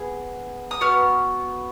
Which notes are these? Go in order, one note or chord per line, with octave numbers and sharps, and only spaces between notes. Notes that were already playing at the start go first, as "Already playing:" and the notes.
Already playing: B3 G#4
D#6
B3 F#4 F6